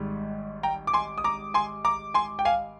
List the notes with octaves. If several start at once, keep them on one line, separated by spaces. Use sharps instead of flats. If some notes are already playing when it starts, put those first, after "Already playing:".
Already playing: G#1 G#2 G3
G5 A#5
D6
G#5 C6
D#6
A#5 D6
G#5 C6
A#5 D6
G#5 C6
G5
F5 G#5